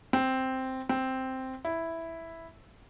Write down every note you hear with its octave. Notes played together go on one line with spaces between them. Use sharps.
C4
C4
E4